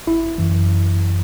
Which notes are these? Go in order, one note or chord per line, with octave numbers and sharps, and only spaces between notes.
G#1 E4
F#2 E3